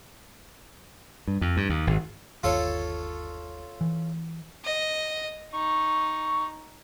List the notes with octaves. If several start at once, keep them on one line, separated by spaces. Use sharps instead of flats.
G2
F2
G2
D#2
G#1
G1 D#2 F4 A4 C#5
E3
D#5
D#4 C#6